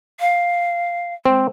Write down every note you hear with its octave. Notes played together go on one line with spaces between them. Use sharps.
F5
G#3 C4